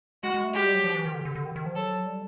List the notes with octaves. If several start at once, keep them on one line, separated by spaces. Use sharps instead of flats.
G#3 F#4
G#3
A3
G#3 G4
G3
F#3
F3
E3
D#3
D3
D3
D3
D#3
D#3
F3
F#3 A4
G3